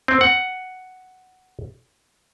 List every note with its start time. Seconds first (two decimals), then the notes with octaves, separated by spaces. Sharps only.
0.08 C4
0.21 F#5